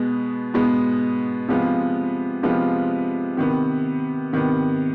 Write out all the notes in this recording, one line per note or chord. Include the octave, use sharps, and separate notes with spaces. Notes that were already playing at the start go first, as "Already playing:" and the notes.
Already playing: B2 G#3 B3
B2 G#3 B3
C3 F3 G#3 B3 F4
C3 F3 G#3 B3 F4
C3 D#3 B3
C3 D#3 B3